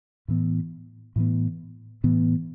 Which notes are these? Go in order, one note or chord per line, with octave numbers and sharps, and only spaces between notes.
A2 E3 B3
A2 E3 B3
A2 E3 B3